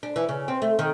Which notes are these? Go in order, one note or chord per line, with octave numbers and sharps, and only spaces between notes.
D4
E3
C#3
C4
A3
D#3